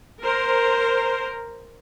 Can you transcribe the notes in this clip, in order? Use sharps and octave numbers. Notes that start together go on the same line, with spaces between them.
A#4 C5